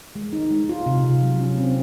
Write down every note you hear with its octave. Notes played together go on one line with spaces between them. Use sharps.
G#3
D#4
G#3
F4
C3
C3
F#3
C#4
C4